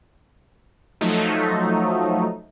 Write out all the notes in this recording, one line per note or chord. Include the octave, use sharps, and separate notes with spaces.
F3 F#3 A3 D#4